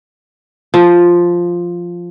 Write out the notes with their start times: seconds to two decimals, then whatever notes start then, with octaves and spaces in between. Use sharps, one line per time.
0.74 F3